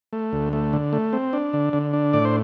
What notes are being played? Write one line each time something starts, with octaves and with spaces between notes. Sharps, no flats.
A3
D2
A3
D3
A3
C4
D4
D3
D3
D4
A2 D5
C5